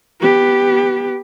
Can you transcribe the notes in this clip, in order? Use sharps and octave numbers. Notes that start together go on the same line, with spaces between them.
B3 G4